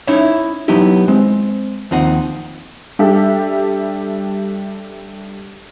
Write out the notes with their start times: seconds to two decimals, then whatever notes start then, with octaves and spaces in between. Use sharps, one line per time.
0.08 C#4 D#4 E4 C#5 E5
0.68 F#3 B3 D#4 E4 G4
1.08 G#3 C4
1.91 D#2 F3 C4 D#4 F#5
2.99 G3 D4 G4 A4 E5